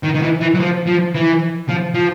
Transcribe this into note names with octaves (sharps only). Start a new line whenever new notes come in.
D#3
D#3
E3
E3
F#3
F3
F3
E3
F3
F3